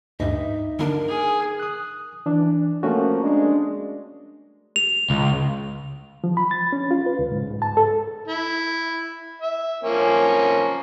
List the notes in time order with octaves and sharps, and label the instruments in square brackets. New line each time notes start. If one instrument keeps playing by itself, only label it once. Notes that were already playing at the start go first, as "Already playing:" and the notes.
[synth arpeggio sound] D2 G2 [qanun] D#4 [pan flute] E5
[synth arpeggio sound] D3 A#3 D4 [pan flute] A#4
[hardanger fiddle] G#4
[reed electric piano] D#6 F#6
E3 D4
[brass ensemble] F3 A#3 [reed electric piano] A3 C#4 F#4
[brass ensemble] G#3 D4
[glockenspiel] F7
[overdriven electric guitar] C#2
[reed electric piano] F3
B5
A6
C#4
F4
B4
C#2
G#2
G#2
A5
A4
[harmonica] E4
E5
F3 A#3 C#4